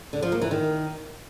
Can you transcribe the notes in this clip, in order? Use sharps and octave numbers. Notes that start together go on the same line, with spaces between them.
D3
F3
A#3
E3
D#3